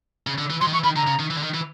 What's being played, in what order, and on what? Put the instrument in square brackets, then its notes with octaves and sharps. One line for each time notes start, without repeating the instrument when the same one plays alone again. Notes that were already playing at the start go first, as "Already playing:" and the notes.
[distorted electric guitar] C#3
D3
E3
[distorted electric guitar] F#3 [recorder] C6
[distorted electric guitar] D#3
[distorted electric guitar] E3 [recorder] C#6
[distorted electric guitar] D#3 [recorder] B5
[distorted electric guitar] D3 [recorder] A#5
[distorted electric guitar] C#3
D#3
E3
D3
D#3
E3